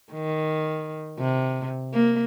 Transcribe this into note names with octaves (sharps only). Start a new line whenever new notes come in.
D#3
C3
A#3